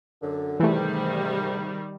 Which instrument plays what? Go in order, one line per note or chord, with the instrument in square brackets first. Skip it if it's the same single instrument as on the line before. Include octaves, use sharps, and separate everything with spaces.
[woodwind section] F#2 D3
[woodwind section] G#2 C3 [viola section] D#3 G3 [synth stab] E3 A3